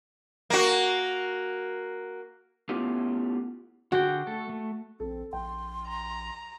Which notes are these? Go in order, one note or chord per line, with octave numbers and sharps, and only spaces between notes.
A#3 F#4
A3 B3 C#4 E4 F4 G4
D3 F#4 G#4 G5
A3 A4
A3
A#1 C4 A4
A#1 G5 C6
A#5